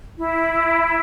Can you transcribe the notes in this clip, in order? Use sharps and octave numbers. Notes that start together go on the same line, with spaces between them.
E4